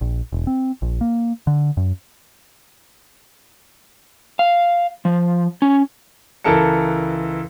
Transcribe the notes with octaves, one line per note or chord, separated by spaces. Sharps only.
A#1
E1
C4
A#1
A#3
D3
F#2
F5
F3
C#4
C#2 E3 A4 A#4 A5 C#7